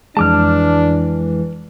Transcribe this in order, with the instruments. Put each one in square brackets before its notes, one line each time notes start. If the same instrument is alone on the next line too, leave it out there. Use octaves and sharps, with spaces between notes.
[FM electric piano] F2 G#3 [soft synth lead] E3 [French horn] D4 [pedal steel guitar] A5 D6 F6